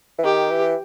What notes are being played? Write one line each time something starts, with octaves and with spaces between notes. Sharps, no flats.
E3
D#3 G4
E3